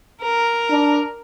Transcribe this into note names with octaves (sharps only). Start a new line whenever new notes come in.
A#4
D4